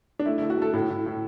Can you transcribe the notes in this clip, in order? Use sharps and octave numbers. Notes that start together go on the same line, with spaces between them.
D4
A3 E4
E4
A3
F#4
A3 A4
A2 A4
A2
A2